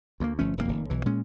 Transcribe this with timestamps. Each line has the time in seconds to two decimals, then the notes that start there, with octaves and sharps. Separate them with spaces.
0.20 D2 A3 A#3
0.39 G1 F3 A3 C#4
0.57 D#1 F2 E3 A#3
0.69 F1 D#3 A#3
0.90 B1 E3
1.06 A#2 G#3 C#4